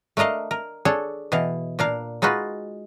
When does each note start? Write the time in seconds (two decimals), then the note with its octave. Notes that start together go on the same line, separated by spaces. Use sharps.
0.17 A3 D4 A#4 D#5 F5
0.51 A#4
0.85 D4 G#4 A4 C#5
1.32 B2 E3 D#5 F5
1.79 A#2 D4 A#4 F5
2.22 G#3 D#4 F4 F#4 B4